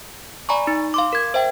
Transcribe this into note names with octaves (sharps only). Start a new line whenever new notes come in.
D5 G#5 A#5 B5 C#6
D#4
F5 C6 D6
A#4 G#6
C5 E5 G5